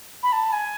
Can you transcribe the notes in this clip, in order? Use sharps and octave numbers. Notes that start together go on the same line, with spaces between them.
B5
A5
G#5